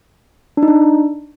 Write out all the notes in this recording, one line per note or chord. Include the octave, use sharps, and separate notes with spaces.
D4
D#4
D4